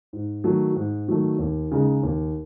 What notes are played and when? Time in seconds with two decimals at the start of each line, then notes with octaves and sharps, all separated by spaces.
0.13 G#2
0.44 D#3 F#3 A3
0.76 G#2
1.08 D#3 F#3 A3
1.39 D#2
1.71 C#3 G#3 D#4
2.03 D#2